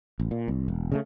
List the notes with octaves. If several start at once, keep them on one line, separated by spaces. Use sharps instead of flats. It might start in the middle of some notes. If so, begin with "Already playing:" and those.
A1
A#2
C2
E1
C#3 G#3 A3